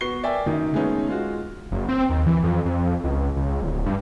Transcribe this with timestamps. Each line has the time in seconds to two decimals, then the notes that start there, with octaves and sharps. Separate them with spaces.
0.01 B3 F#4 C#6 C7 G7
0.23 A#4 D5 E5 G5 G#5
0.46 F#2 D#3 D#4
0.73 D#3 G#3 A3 B3 C#4 D#4
1.08 G#3 F4 F#4
1.71 F#1
1.89 C4
2.09 D#2
2.26 E3
2.43 F2
2.65 F2
3.04 C#2
3.36 C#2
3.62 D1
3.86 G2